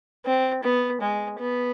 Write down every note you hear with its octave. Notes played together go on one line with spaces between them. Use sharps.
C4
B3
G#3
B3